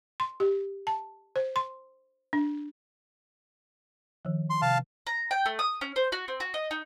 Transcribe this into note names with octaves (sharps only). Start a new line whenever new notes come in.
C6
G4
A5
C5
C6
D4
D#3 F3
C6
C3 F5 A5
A#5
G5
A3
D#6
C#4
C5
F#4
C4
F#4
D#5
D#4